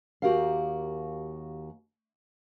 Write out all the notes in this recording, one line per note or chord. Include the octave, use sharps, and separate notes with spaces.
D#2 F#4 G4 A#4 E5 F5